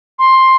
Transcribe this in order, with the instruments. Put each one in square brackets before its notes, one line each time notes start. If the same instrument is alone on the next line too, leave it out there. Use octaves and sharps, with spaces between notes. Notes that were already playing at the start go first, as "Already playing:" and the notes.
[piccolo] C6